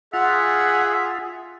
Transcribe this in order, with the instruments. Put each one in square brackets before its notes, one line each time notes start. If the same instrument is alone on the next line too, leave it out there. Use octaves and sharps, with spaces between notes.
[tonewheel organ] F4 [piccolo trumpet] G#4 [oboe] E5 [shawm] F#5